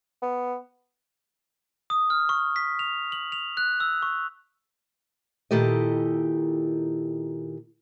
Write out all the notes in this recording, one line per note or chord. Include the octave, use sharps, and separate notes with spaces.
B3
D#6
F6
C#6
B6
F7
F#7
F7
F#6
E6
C#6
A#2 D#3 E4 G4 A4 D#5